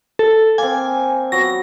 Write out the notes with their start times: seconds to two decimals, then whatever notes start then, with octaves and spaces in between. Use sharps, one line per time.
0.19 A4
0.58 A#3 C4 G#5
1.32 F#3 B3 A#6